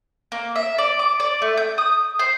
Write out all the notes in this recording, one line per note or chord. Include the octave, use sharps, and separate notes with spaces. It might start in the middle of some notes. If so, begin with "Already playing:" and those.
A#3
E5
D5
D6
D5
A3
G6
D#6
C5